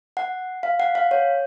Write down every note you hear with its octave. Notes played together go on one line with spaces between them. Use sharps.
F#5
F5
F#5
F5
C#5